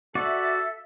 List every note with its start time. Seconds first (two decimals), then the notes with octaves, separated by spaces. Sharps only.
0.15 F#4 A4 D5 E5 E6